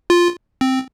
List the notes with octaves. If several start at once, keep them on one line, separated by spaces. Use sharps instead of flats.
F4
C4